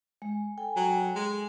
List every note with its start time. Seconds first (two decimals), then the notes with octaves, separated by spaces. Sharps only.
0.22 G#3
0.58 A4 G5 G#5
0.76 F#3
1.15 G#3